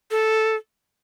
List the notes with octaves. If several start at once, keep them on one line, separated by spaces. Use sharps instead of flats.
A4